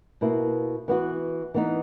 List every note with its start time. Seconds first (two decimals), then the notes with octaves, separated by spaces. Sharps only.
0.21 B2 A#3 E4
0.88 E3 B3 F#4
1.54 E3 B3 D#4